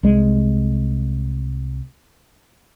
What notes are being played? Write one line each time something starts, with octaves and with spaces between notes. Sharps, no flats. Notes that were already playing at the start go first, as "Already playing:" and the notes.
C2 G#3